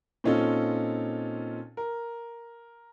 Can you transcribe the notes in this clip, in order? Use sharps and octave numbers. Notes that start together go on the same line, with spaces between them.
A#2 C4 C#4 D#4 F4 A4
A#4